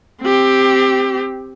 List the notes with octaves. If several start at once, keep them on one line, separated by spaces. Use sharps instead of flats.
C4 G4